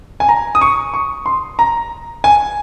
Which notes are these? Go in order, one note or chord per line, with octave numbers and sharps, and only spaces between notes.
G#5
A#5
D#6
C#6
C#6
C6
A#5
G#5